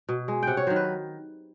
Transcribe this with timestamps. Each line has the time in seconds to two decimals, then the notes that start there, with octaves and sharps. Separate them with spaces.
0.09 B2
0.28 G#3
0.43 C3 F#5 G5
0.57 C#5
0.67 D#3 F#3 C5
0.76 B4